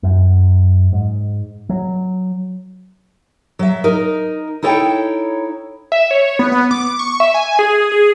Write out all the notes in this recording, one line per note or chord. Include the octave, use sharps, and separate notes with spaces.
F#2
G#2
F#3
F#3 E5
D#4 A#4
D#4 E4 A4 C#5 F#5 G5
E5
C#5
B3
B3
D6
C#6
E5
G#5
G#4
G#4